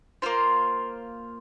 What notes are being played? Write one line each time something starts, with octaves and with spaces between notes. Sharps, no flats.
A#3 F4 C5